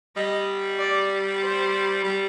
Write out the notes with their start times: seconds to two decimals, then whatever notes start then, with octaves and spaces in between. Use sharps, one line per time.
0.16 G3 D#5
0.79 D5
1.42 C5
2.04 G3